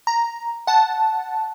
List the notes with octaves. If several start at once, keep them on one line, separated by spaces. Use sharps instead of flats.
A#5
F#5 A5